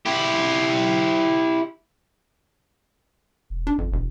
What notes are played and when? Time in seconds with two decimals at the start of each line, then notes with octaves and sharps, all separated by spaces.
0.06 E4 G4
3.50 E1
3.67 D4
3.78 G1 F2
3.92 E1